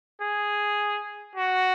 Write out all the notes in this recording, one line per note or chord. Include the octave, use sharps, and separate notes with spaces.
G#4
F#4